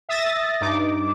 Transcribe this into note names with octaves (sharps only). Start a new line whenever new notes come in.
E5 D#6 A6 A#6
G2 D#4 D6